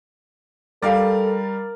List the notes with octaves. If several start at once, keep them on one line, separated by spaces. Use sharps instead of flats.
G3 A4 A#4 D5 F5